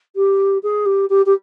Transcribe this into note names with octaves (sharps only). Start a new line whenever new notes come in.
G4
G#4
G4
G4
G4